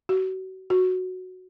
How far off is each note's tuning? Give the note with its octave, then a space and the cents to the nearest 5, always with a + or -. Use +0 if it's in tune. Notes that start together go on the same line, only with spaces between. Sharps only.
F#4 +30
F#4 -5